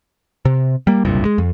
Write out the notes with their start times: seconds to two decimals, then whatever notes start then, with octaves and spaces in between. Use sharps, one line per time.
0.45 C3
0.87 G3 A#3
1.05 F#1 C2 G2 A#2
1.25 G#3
1.38 F2